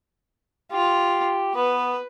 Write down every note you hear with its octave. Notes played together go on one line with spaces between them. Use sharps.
F4 G4
B3 B4